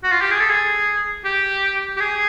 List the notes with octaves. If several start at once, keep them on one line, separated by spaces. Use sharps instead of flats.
F#4
F4
G4
G#4
A4
G#4
G4
G4
G#4